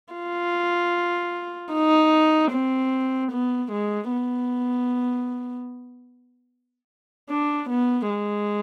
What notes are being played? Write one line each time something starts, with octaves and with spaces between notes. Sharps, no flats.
F4
D#4
C4
B3
G#3
B3
D4
B3
G#3